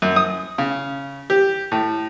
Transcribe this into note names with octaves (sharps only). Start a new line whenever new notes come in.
F#2
D#6
C#3
G4
A2